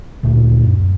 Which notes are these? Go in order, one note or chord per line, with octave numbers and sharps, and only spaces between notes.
D2 A#2 A3
F#2